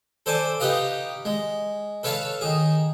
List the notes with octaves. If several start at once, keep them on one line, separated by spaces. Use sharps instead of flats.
A4 C5 D5 G#5
D#4 G4 B4 D#5 F5
G#3
A4 B4 C#5 F5 A5
D#3 G#4